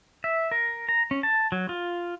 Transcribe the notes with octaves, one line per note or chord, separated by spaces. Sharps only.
E5
A#4
A#5
C#4
A5
F#3
F4